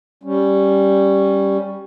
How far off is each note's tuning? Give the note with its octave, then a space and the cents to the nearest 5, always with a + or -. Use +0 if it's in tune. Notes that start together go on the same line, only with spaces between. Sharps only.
G3 +0 C#4 +0